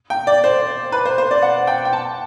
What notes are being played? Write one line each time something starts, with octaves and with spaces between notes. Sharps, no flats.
G5
D5
C5
B4
C5
C5
D5
F#5
G5
G5
A5